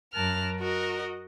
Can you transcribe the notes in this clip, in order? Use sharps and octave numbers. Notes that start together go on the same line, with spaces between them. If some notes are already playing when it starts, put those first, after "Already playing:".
F#2 A#4 A5 F6 F#6
F#4 A#4 D#5